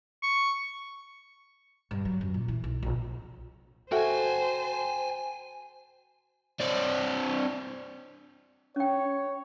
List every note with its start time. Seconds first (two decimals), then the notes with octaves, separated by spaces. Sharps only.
0.23 C#6
1.91 G2
2.05 F#3
2.21 F#2
2.34 A#2
2.48 E3
2.64 B1
2.83 A#1
3.92 F#4 A4 C5 E5 G5 G#5
6.60 C4 D4
8.76 C#4 C#5 G5